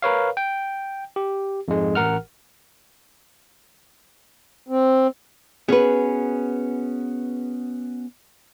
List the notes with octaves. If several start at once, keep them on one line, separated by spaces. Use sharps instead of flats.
A#4 B4 C#5 F5
G5
G4
F2 G#2 G#3
A1 A#4 F#5 F6
C4
B3 C#4 F#4 G#4 B4